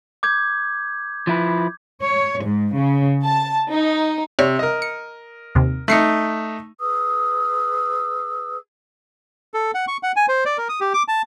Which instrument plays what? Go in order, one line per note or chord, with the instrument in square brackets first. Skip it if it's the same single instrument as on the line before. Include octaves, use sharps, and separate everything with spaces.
[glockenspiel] D6 G6 G#6
[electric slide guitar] F3 E4 B4
[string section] C#5
G#2
C#3
A5
D#4
[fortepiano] C3 [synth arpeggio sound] C#5 D5 F6
[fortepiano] A#4 D#5
[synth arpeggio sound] C#7
D#2 C3
[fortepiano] A3 D#4 [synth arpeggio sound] F#6 C7 C#7
[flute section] G#4 B4 D#6 E6
[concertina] A4
F#5
C#6
F#5
G#5
C5
D5
A#4
D#6
G4
D6
A5